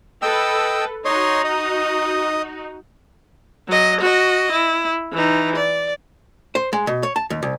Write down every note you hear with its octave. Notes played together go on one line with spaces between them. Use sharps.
A4 B4 D#5 G5 E6
D#4 F#4 C#5 D#5 C6
D#5
F#3 D#5
F#4 D#5
E4
E3 D#4
D5
C5
G#3
B2
C#5
A5
D#2
C2